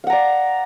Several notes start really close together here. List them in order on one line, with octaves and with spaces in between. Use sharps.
F5 F#5 A#5 D5